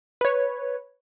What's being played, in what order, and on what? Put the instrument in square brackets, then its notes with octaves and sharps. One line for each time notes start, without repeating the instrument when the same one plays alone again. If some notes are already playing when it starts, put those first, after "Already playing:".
[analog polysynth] B4 C#5